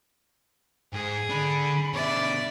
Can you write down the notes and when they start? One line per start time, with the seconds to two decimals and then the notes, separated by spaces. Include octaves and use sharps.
0.93 G#2 G#4
1.30 D3 D4 B5
1.93 B2 D3 D5 E5